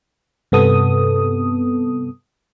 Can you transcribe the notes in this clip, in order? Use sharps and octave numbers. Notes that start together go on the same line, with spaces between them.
G2 C3 B3 A4 D#6